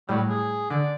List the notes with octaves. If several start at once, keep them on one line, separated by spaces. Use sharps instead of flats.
A2 F#3 G3
G#4
D3 D5